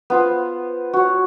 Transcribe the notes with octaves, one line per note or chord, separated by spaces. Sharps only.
B3 F4 C5
F#4 C#5